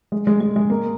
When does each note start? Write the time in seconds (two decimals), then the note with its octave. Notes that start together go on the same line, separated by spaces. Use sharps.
0.12 G#3
0.27 G#3
0.41 G#3
0.56 G#3
0.70 A#3